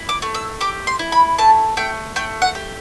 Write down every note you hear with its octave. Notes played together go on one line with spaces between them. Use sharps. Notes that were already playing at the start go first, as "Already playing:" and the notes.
Already playing: E4
D6
A3
E6
G4 D6
C6
E4
B5
A3 A5
A3 G5
A3 G5
F#5
G4